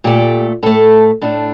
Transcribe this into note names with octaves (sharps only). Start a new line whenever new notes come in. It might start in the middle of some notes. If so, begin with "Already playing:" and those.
A#2 A3 G4
A2 A3 A4
A2 A3 D4